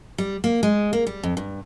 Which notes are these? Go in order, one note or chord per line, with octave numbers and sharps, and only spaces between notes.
G3
A#3
G#3
A#3
G3
F2
G2